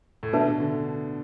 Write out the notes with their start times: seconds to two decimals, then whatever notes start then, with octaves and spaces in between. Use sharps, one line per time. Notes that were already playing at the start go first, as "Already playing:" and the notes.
0.23 A2
0.33 B2 D4 B4 E5 A5
0.60 D3